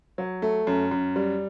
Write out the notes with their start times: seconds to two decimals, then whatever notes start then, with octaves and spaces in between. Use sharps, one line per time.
0.18 F#3
0.42 A3
0.67 F#2
0.91 F#2
1.16 G3